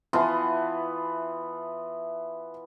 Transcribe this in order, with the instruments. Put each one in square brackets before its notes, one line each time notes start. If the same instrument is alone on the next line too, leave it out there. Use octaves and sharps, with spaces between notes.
[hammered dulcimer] E3 B3 F4 [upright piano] E5 A5 C6